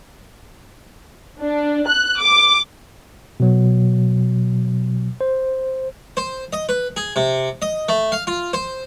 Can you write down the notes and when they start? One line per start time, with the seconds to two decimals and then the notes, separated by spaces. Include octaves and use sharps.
1.40 D4
1.87 F#6
2.20 D6
3.40 B2 F#3
5.21 C5
6.17 C5
6.53 D#5
6.69 B4
6.97 G#4
7.16 C3
7.62 D#5
7.89 A3
8.12 F5
8.27 F4
8.53 C5